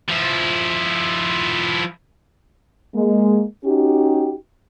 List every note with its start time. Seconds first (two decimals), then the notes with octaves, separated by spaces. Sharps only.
0.08 F3 E4
2.95 G#3 A#3
3.65 C#4 D#4 F#4 G4